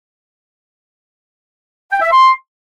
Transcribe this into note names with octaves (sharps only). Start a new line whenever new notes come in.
G5
E5
C6